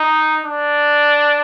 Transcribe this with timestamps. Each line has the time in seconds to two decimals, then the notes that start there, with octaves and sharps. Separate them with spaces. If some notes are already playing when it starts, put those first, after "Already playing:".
Already playing: D#4
0.45 D4